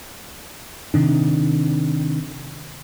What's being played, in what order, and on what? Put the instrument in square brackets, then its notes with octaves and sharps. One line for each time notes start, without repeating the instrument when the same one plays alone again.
[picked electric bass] C3 D#3 D4